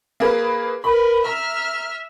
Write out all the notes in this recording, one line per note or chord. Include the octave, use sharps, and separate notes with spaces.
A#3 G#4 B4
A#4 B4 B5
E5 A#5 F6